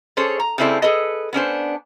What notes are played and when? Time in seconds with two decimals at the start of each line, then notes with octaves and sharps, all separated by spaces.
0.17 C#4 G#4 A4 C5 C#5
0.40 A#5
0.58 C#3 G3 C4 E4 A4 D5
0.82 G#4 A4 B4 D#5
1.33 B3 C#4 D4 C5